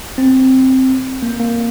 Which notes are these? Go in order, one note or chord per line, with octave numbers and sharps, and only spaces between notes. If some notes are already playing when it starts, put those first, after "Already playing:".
C4
A#3
A#3